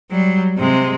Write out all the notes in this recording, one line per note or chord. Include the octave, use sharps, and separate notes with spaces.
F#3 G3
C3 G#3